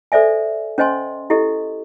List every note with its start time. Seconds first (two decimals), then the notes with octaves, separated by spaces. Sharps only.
0.12 A4 C5 D5 E5 G#5
0.78 C#4 C5 D#5 G#5 C6
1.30 E4 G4 A4 D#5